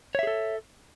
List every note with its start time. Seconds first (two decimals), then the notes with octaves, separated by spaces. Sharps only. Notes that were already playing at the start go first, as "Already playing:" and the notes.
0.15 C#5
0.19 E5
0.23 G#4
0.27 A4